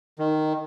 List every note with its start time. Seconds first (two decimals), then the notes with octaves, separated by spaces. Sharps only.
0.19 D#3